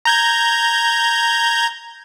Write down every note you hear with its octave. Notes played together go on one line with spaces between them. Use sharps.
A#5 G6 G#6